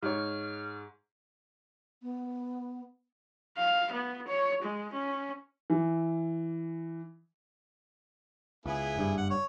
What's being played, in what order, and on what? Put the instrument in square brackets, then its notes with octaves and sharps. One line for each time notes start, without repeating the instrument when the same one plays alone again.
[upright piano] G#2 C#5 [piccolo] F6
[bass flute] B3
[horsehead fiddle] F5
B3
C#5
G#3
C#4
[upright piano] E3
[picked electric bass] C#2 [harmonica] B3 E4 G#4
[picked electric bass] F#1 G2
[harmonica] F#5
C#5